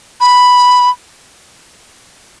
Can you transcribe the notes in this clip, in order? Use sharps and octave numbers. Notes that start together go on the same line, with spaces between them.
B5